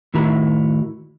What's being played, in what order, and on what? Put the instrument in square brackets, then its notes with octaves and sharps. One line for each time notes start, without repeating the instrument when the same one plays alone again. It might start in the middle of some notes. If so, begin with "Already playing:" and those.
[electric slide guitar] A2 D#3 E4 F#4 A#5